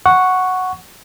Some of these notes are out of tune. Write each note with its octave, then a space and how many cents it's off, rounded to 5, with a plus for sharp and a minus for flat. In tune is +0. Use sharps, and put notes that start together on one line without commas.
F#5 +0 C#6 +0